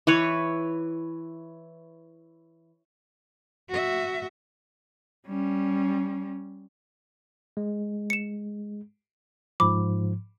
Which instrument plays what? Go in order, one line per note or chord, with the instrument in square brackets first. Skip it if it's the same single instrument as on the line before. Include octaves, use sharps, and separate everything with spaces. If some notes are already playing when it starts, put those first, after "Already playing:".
[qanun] E3 B4 C#5
[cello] F#4 E5
G3 C#4
[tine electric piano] G#3
[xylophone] C#7 E7
[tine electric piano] G#2 F3 [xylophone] B5 D6